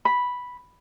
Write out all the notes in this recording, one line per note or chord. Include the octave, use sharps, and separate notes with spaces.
B5